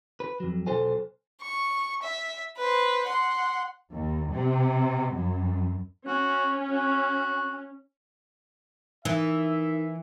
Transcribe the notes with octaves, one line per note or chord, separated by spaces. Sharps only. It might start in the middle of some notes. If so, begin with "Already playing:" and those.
B4
F2 F#3
B1 A4 C5 G#5
C#6
E5
B4 C5
F#5 C6
D#2
C3
F#2
C#4 F#4
F#4
E3 D#4 A#4 E5